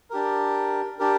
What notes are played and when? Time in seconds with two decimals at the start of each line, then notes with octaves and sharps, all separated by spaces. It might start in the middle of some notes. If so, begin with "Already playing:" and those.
0.10 D4 G4 A#4
0.99 D4 G4 A#4